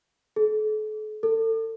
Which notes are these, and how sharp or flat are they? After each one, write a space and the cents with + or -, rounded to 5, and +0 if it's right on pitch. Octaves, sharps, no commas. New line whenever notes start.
A4 -40
A4 +30